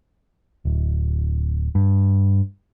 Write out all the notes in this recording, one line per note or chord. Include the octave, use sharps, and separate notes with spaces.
D1
G2